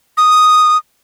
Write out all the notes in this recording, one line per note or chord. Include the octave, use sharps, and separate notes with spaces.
D#6